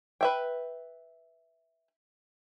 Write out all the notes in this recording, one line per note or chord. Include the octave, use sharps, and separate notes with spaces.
B4 E5 G5